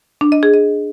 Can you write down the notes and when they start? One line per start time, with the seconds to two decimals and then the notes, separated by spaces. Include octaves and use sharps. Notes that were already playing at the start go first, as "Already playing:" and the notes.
0.21 D4
0.32 D#5
0.43 G#4
0.54 D#5